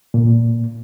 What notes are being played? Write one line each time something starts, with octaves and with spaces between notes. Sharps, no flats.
A#2